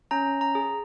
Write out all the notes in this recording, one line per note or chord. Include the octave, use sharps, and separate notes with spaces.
C#4 A#5
A#5
G#4